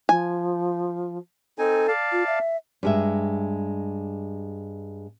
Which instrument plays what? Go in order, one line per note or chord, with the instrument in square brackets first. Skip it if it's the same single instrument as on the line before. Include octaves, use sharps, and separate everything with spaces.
[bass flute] F3 [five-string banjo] G#5
[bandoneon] C4 D#4 G#5 [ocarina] A4
[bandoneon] D5 F5 A5
[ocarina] F4
E5
[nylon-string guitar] G2 G#3 E5